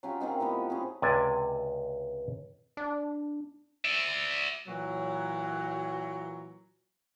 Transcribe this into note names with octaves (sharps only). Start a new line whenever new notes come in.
F#3 C#4 F4 G4
D#3 A#3 C4 D#4
A2 F3 B3
C4 C#4 G#4
C#2 C3 D5 G#5 A5
D4
D5 E5
A#2 E3 F#3